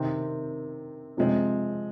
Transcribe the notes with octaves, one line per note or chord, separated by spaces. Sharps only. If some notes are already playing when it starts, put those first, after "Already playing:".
Already playing: C3 D#3 C4
C3 F3 G#3 C4